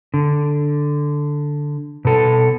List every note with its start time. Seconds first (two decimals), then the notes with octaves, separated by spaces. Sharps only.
0.14 D3
2.05 B2 A4